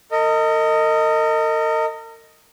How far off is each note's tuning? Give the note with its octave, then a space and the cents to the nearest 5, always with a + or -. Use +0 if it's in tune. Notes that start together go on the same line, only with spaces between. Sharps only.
A#4 -45 D#5 +5